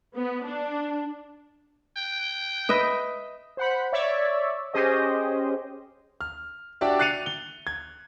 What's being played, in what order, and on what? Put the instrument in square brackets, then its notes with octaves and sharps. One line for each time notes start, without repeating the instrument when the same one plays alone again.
[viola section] B3
D4
[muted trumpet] G5
[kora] B4 D#5 E5
[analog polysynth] C5 F#5 B5
C#5 D5 E5
C#4 G4 G#4 C5 D#5
[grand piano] F6
D4 F#4 G4 D5 E5
F#6 A6 C7 C#7 D#7 F7
G7
G#6